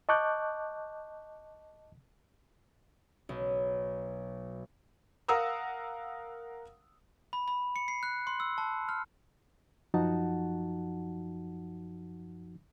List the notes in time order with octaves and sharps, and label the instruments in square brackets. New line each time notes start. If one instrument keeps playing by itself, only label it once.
[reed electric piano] D#5 A5 C#6 D6 F#6 G6
[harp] B1
[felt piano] A#4 F5 F#5 A#5 D#6 E6
[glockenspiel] B5
B5
C#7
C7
F#6
C6
E6
A5
F6
[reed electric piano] F#2 F3 D#4 F#4 F#5 A5